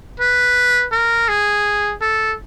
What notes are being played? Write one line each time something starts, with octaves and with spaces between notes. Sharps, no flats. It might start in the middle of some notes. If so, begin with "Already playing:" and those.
B4
A#4
G#4
A4